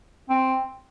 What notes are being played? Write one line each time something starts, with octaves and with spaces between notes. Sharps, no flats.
C4